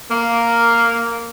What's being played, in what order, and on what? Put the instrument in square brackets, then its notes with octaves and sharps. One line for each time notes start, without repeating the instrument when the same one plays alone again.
[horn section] A#3